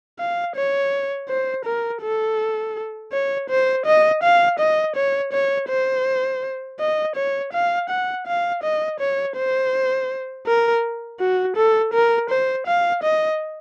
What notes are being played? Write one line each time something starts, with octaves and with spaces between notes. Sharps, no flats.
F5
C#5
C5
A#4
A4
C#5
C5
D#5
F5
D#5
C#5
C#5
C5
D#5
C#5
F5
F#5
F5
D#5
C#5
C5
A#4
F#4
A4
A#4
C5
F5
D#5